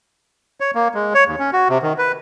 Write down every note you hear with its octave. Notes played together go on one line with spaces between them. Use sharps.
C#5
A#3
G#3
C#5
D#2
C#4
F#4
C3
D#3
B4